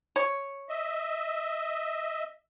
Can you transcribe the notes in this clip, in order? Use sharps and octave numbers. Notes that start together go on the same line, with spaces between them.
C#5
D#5 E5